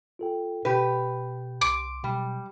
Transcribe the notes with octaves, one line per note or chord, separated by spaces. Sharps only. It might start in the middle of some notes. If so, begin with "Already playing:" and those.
F4 A4 G5
B2 G4 B4
C2 C6 D6
B2 F#3 G3